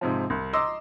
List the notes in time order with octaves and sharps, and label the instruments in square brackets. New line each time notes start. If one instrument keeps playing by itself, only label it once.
[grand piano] G#2 C3 F3
C2
D#5 A#5 C6 D6 E6